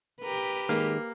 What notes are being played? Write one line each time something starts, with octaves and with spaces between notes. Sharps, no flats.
G4 A#4 B4
D#3 G#3 A#3